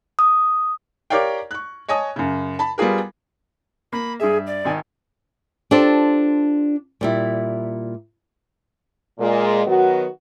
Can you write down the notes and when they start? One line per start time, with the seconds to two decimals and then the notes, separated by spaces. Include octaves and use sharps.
0.19 D#6
1.10 G4 A#4 C#5 D5 F5 G5
1.51 C#6 F#6
1.88 C#5 D#5 G#5 A5 D#6
2.16 F#2 C#3
2.59 A5 B5
2.78 G3 B3 F4 G#4 A#4
3.93 A#3 B5
4.20 G2 G#4 E5
4.47 D5
4.65 G#1 D#3 G#5
5.71 D4 F4 G4 A4 C5 D5
7.01 A#2 G3 E4
9.19 A#2 G#3
9.67 D#3 F#3 B3 F#4